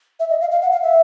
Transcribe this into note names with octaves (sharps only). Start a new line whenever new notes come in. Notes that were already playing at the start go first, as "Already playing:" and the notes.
E5
D#5
F5
F5
F#5
F5
E5